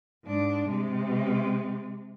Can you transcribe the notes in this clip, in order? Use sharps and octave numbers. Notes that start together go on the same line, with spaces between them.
G#2 D4
C3 G#3